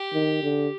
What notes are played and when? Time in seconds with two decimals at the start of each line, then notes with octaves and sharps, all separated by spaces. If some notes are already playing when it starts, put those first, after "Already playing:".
Already playing: G4
0.14 D#3
0.43 D3